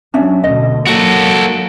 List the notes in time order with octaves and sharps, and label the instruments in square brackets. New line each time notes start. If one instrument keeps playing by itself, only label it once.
[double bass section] F#3 [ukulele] C#4 D4 E5
[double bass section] D2 B2 [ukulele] D#5
[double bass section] F#3 A#3 [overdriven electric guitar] F#4 A4